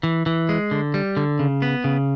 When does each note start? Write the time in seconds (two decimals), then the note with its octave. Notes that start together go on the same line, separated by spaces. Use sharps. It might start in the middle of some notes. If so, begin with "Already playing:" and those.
0.03 E3
0.26 E3
0.49 G#3
0.71 D3
0.94 G3
1.17 D3
1.39 C#3
1.62 B3
1.84 C#3